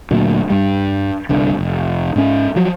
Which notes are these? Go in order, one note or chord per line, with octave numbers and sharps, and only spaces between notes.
D2 A#2 F#3
G2 G3
G1 C2 G2 D3
F1
G#2 C#4
F3 F#3